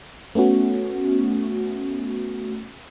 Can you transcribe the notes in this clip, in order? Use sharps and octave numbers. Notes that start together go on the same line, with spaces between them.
A3 B3 C#4 F#4